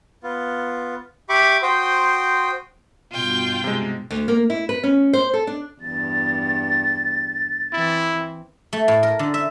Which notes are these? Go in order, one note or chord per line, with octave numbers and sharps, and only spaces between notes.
B3 F4
G4 E5 B5 C#6 D6
F#4 C5 G5 C6 D#6
G2 B2 F4 G5
C3 G#3
D2
A#3
E4
B4
C#4
C5
A4
D4
E2 G2 A6
E3 C4 E4
A3
A2
A#4
D3
E5